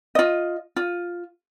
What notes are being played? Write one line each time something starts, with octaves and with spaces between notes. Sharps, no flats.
F4 D#5
F4